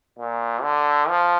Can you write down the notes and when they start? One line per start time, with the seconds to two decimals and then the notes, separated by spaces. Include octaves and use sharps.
0.19 A#2
0.63 D3
1.09 F3